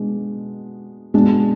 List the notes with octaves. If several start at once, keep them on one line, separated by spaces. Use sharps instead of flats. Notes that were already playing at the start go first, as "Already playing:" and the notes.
Already playing: B2 G#3 B3 D4
B2 G#3 D4